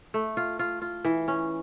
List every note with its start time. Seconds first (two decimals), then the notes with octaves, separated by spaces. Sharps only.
0.14 A3
0.37 F4
0.59 F4
0.82 F4
1.05 E3
1.28 C#4